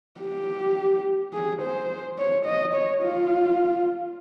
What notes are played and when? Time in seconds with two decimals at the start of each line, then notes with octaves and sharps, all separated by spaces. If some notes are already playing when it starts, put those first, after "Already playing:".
0.20 G4
1.33 G#4
1.62 C5
2.18 C#5
2.46 D#5
2.74 C#5
3.03 F4